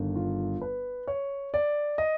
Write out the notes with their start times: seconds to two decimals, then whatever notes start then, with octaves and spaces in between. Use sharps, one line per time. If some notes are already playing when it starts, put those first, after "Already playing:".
Already playing: G1 G2 D#3
0.16 F4
0.61 B4
1.07 C#5
1.54 D5
1.98 D#5